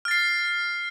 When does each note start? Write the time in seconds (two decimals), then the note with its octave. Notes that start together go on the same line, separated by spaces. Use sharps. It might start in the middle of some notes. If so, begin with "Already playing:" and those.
0.05 F6
0.08 A6
0.11 C7